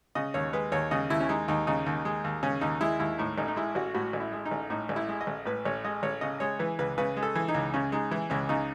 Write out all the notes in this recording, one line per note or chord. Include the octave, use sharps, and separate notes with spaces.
C#3 D#5
D#2 C#5
G#3 B4
D#2 C#5
C#3 D#5
D#2 E4
C#4
G#3 D#4
D#2 D#4
C#3 D#4
D#2
G#3
D#2
C#3 C#4
D#2 D#4
G#3 E4
D#2 E4
A2 D#4
A1 D#4
D#4
G#3 E4
A1 F#4
A2 F#4
A1
E4
G#3
D#4
A1
A2 D#4
A1
E4
G#3
D#5
A1
A2 B4
A1 C#5
G#3 D#5
A1 C#5
C#3 D#5
G#3 C#5
E3 B4
C#2 B4
C#3 B4
G#3
A4
E3
D#4
C#2
C#3 C#4
G#3 D#4
E3 E4
C#2 C#4
C#3 D#4